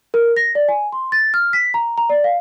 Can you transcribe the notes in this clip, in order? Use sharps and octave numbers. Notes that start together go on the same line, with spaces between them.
A#4
A#6
D5
G#5
C6
A6
F6
B6
A#5
A#5
D5
F5